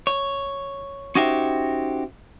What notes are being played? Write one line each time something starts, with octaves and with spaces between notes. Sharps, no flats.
C#5
C#4 D#4 F#4 G4 C5 E5